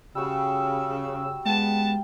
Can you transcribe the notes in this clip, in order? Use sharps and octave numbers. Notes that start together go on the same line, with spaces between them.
C#3 G3 F#4 E6
G#3 B3 F5 G5 A5